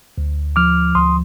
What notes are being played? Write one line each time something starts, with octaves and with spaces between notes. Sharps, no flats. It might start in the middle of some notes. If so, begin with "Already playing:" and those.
D2
F3 D6 F6
D2 C6 D#6